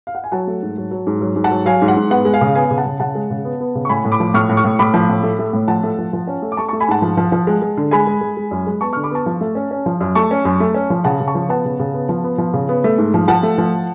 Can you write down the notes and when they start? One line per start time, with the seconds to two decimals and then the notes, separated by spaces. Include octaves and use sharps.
0.07 F5
0.15 F#5
0.24 G#5
0.32 F#3 F#5 A5
0.48 A3
0.62 G#2
0.77 F#3
0.91 F#3
1.07 G#2
1.21 F#3
1.36 G#2
1.44 F#5 A5
1.51 F#3
1.66 F#3 F5 G#5
1.82 G#2
1.88 F#5
1.97 G#2
2.10 B3 F#5
2.25 G#3
2.34 F5 G#5
2.41 C#3
2.55 B3 F5 G#5
2.71 C#3
2.78 F#5 A5
2.85 C#3
3.00 C#3 F#5 A5
3.15 G#3
3.31 C#3
3.45 B3
3.60 B3
3.75 C#3
3.85 C#6
3.89 A2 G#5 B5
4.05 A2
4.12 B5 D6
4.20 F3
4.34 A2 C#6 F6
4.49 A2
4.57 C#6 F6
4.64 A2
4.79 A2 B5 D6
4.94 F3
5.09 A2
5.23 A3
5.39 A3
5.53 A2
5.68 F3 F#5 A5
5.83 A3
5.98 F3
6.13 F3
6.27 C#4
6.42 A3
6.52 D6
6.57 A3 A5 C#6
6.68 A3 A5 C#6
6.80 G#5 B5
6.88 G#2 F#5 A5
7.02 F3
7.17 F3
7.32 F3
7.47 G#3
7.62 G#3
7.77 D3
7.91 G#3 G#5 B5
8.07 G#3
8.21 G#3
8.37 G#3
8.51 F#2
8.67 G#3
8.81 B3 A5 C#6
8.93 D3 C#6 F6
9.03 B5 D6
9.11 B3 A5 C#6
9.26 F3
9.41 A3
9.55 C#4
9.71 C#4
9.86 F3
10.00 F#2
10.15 A3 A5 C#6
10.31 C#4
10.45 F#2
10.60 A3
10.74 C#4
10.90 F3
11.04 C#3 F#5 A5
11.20 C#3
11.27 A5 C#6
11.35 F3
11.49 B3 F#5 A5
11.65 C#3
11.79 C#3
11.94 B3
12.09 F3
12.24 B3
12.38 F3
12.54 C#3
12.69 B3
12.84 A3
12.98 G#2
13.14 F3
13.28 F3 F#5 A5
13.43 A3
13.58 F3